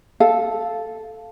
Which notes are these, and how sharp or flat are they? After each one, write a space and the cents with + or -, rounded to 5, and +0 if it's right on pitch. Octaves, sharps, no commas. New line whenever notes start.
A4 -5 F5 +0